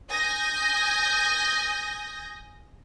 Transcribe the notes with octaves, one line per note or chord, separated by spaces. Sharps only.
G#5 D#6 G6 A#6